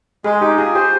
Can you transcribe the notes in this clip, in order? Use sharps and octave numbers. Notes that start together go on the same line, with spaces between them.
G#3 G#4
D#4 G4
F4 G#4
G4 C5